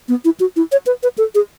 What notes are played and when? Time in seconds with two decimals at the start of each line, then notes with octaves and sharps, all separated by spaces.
0.08 B3
0.25 E4
0.40 F#4
0.56 E4
0.72 C#5
0.86 B4
1.03 B4
1.18 A4
1.35 G#4